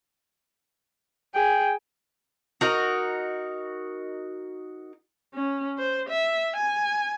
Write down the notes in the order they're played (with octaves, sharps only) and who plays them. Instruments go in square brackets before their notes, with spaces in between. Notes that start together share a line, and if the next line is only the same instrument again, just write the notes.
[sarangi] G#4 [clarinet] G5
[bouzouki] D#4 F#4 A#4 D#5
[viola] C#4
C5
E5
G#5